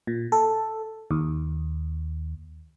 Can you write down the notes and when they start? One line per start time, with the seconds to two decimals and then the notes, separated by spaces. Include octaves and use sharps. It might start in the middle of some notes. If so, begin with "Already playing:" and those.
0.07 A#2
0.32 A4
1.11 D#2